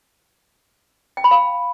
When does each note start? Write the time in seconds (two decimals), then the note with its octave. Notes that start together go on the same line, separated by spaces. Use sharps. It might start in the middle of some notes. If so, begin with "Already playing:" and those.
1.17 G5
1.24 B5
1.31 F5